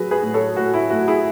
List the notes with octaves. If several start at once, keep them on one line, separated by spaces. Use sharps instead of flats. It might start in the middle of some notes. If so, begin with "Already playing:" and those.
Already playing: F#3 F#4 G#4 B4
G#4 B4
A2
A4 C#5
A2 F#4
E4
A3 F#4
E4 G#4